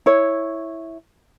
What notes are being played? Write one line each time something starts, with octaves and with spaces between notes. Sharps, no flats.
E4 C#5